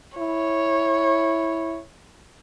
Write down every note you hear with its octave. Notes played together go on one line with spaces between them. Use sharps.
E4 C#5